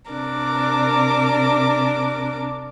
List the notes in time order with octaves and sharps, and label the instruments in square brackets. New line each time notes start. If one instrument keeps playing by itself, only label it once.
[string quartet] C3 D4 A#4 D6